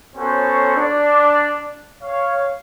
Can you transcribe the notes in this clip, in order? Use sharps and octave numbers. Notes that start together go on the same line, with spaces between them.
B3 C#4 F#4 A4 C5 C#5
D4
C#5 F5